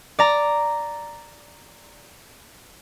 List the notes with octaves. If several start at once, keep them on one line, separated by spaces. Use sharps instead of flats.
D5 A#5